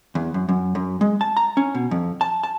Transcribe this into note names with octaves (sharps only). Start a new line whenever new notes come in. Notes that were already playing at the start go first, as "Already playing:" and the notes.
E2
F#2
F#2
F#2
G#3
A5
A#5
C#4
B2
F2
A5
A5